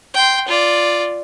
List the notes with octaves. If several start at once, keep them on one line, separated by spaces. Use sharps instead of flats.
G5 C6
F4 D5